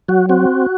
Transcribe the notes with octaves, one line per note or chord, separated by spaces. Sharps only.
F#3 F#4
C4 F#4